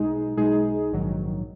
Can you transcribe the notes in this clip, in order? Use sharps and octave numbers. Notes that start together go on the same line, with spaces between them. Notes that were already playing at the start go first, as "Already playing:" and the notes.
Already playing: B1 B2 G#3 D#4 G#4
B1 B2 G#3 D#4 G#4
A#1 G#2 D#3 F#3